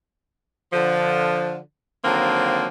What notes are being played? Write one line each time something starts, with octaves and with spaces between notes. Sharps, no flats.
D3 F3
D3 D#3 F3 F#3 A#3 C4